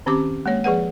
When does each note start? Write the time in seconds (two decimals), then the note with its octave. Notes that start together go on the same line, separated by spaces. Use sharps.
0.06 D#3 C4 C#4 G4 D6
0.46 G#3 A#3 C#5
0.64 F3 G#4 B4 F#5